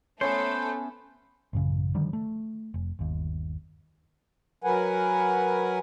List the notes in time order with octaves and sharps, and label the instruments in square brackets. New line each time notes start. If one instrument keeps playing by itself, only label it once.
[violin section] A3 A4 [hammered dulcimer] B3 C#4 [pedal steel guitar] C5 [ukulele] C#5
[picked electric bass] A1 F#2 C#3
D3 D#3 F3 G3
A3
F1
G1 D#2
[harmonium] F#3 A#4 B4 F#5 G#5